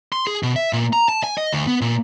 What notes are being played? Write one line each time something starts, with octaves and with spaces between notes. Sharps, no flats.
C6
G#4
B2
E5
A#2
A#5
A5
G#5
D#5
D2
B3
A#2